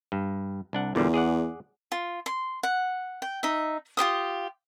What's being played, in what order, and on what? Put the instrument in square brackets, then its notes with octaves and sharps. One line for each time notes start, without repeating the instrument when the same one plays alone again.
[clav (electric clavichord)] G2
C2 D4 F#5
[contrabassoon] E2 [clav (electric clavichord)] A#2 D3 G3
[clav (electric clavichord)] G#4 D5 F#5
[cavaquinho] F4
C6
F#5
G5
D#4 E5
F4 G4 C5 D#6